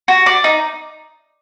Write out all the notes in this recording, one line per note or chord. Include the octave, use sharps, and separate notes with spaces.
F#4
D5
D#4